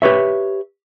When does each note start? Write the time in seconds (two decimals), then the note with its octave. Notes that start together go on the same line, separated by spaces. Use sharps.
0.02 G4 B4 C#5 E5